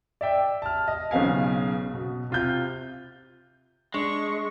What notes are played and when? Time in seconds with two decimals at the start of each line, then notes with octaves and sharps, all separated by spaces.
0.21 D5 E5 G5
0.62 A5 F6
0.88 D#5
1.11 B1 C#3 B3 F5 G#5
1.94 B2
2.30 C3 F4 G6
3.94 G#3 D4 C#6